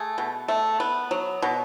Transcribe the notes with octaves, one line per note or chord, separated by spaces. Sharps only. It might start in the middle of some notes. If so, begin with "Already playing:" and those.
Already playing: A3 G#4
B2
A3
B3
F#3
B2